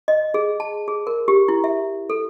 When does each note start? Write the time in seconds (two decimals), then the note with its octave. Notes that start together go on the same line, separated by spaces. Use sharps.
0.08 D#5
0.34 G#4
0.60 A5
0.88 G#4
1.07 A#4
1.28 G4
1.48 E4
1.64 E5
2.10 A4